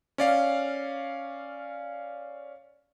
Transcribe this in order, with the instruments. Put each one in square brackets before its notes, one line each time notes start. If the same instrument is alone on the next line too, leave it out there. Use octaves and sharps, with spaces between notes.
[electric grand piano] C#4 D5 F5